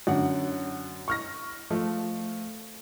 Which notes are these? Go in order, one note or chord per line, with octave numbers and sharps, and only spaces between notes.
F#2 D3 F#5
C#6 F6 A#6
F3 A3